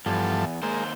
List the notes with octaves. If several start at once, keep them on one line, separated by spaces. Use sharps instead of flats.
E2 G2 F3 A4
D#2 G#3 A#3 C5